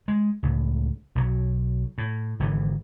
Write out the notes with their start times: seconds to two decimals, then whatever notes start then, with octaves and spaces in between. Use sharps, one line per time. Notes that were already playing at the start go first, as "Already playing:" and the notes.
0.08 G#3
0.43 C#2 A2
1.15 B1 D#3 F#3
1.98 A2
2.40 G#1 D3 E3